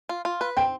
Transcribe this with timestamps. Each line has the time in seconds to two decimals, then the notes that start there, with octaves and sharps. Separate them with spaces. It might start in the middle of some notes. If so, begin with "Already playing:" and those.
0.09 F4
0.25 F4
0.41 B4
0.57 C4 G5